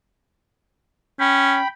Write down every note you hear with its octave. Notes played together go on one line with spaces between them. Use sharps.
C#4 G5 B5